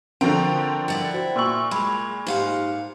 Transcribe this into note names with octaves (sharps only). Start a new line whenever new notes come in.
D3 F3 C4 A#4 G5 A#5 C#6
E4 D5 F#5
F#4 C5 G5
A#2 C6 C#6 E6 F#7
G#3 B5 F7
G#2 D#4 G4 F5 F#5 C6